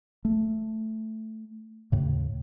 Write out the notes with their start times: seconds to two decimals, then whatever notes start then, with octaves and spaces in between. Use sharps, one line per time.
0.25 A3
1.92 D#2 A2 C#3